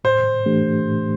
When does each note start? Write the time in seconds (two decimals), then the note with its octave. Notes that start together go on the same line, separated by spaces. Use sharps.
0.04 A2 C5
0.46 E3 A3 D4 G4
0.86 A2